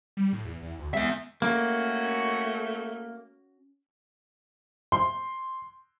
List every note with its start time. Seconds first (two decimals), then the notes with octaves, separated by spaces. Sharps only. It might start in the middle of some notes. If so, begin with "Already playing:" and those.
0.17 G3
0.33 A2
0.45 E2
0.63 E2
0.79 D2
0.94 G#3 B3 E5
1.42 A3 A#3 C#4 F#4
4.92 C6